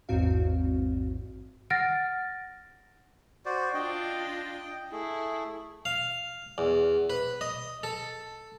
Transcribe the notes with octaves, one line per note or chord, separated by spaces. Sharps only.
A1 E2 G#2 C4 F#4 F5
F#5 F6 A6 A#6 D7
F#4 C5 D5
D4 F4 D#5 G5
A3 E4 G#4
F5
E2
B4
D#5
A4